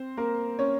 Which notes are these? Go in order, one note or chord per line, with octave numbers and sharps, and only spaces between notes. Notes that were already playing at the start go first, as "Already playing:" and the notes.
Already playing: C4 C5
A#3 A#4
C#4 C#5